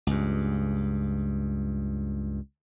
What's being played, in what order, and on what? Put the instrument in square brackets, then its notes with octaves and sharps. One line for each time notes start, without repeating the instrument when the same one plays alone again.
[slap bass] C#2 G2